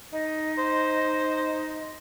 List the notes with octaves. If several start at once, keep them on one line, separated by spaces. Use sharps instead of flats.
D#4 D#5
C5